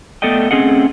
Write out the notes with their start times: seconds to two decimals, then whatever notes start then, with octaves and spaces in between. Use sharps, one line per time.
0.22 A3 B3 A4 D5 D#5 G5
0.51 A3 C4 C#4 G#4 D#5 F#5